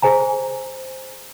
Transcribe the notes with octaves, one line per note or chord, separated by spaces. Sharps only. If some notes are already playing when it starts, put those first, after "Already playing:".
G#4 C5 G#5 A#5